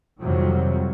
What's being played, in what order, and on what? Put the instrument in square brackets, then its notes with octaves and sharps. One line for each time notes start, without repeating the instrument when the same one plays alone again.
[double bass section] F2 C3 D#3 F#3 G3